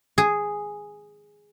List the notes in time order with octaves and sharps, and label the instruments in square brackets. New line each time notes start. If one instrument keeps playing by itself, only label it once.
[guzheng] G#4